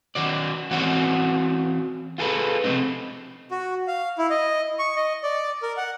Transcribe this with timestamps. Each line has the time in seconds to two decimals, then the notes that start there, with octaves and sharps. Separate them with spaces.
0.15 D#3 F#3 D5
0.71 E3 C4 F#4 C#5 D5 F#5
2.18 F4 G#4 A4 B4
2.64 C3 F3 G#3 A3 C4 D#4
3.51 F#4
3.87 F5
4.18 E4
4.30 D#5
4.79 C#6
4.96 D#5
5.23 D5
5.62 A#4
5.77 F#5